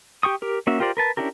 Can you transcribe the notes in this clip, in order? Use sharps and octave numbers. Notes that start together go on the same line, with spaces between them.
G4 G5 C#6 D#6
G4 A#4
A#3 C#4 F#4 E5
F4 G4 A#4 C5 D5
A#4 B4 A5
C#4 D4 E4 G4 A#4